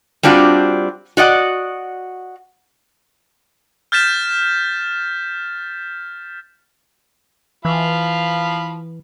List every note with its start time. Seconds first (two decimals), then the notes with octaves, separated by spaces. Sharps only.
0.23 G3 C4 D4 F4 F#4
1.17 F#4 D5 D#5 F#5
3.92 F6 G6 A6 B6 E7
7.65 E3 F3 F5 B5